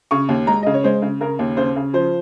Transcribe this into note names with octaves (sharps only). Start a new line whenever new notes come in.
C#3 C#6
D#2
G#3 A#5
C#3 D#5
C#5
G#3 C5
C#3
C#3 A#4
D#2
C#3 C5
C#3
F3 C5